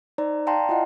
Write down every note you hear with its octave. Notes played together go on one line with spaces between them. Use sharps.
D#4 C5 D5 A#5
D5 F5 G5 A5 A#5 C6
E4 F4 D#5 F#5